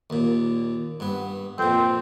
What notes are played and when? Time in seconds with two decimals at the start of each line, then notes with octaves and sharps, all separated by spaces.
0.10 D#2 A#2
1.00 G2 B3
1.58 F2 A#2 C4